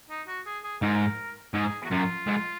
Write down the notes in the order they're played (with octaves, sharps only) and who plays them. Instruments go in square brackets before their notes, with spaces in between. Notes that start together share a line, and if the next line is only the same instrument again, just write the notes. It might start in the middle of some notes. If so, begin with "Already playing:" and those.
[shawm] D#4
F#4
G#4
G#4
[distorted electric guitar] G#2 [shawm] A#4
[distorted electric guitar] G#2 [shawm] G#4
[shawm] F#4
[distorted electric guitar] F#2 [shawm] F4
[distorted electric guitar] G#2